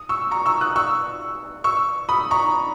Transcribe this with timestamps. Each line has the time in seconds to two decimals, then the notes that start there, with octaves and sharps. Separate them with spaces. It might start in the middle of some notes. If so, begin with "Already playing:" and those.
Already playing: D#6
0.09 C#6 E6
0.31 A#5 C#6
0.46 C#6 E6
0.61 D#6 F#6
0.76 C#6 E6
1.64 C#6 E6
2.09 B5 D#6
2.31 A#5 C#6